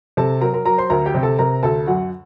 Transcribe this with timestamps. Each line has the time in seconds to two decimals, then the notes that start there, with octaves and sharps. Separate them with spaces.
0.17 C3 A4 A5
0.41 F#3 A#4 A#5
0.54 A#4 A#5
0.65 F#3 A#4 A#5
0.78 C5 C6
0.90 D2 A#4 A#5
1.06 G4 G5
1.15 C3
1.23 A4 A5
1.39 C3 A#4 A#5
1.63 D2 A4 A5
1.87 F#2 F#4 F#5